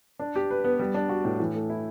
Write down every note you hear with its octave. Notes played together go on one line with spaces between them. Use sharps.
D4
G4
B4
B3
G3
D4
F#4
A2
E3
A3
E4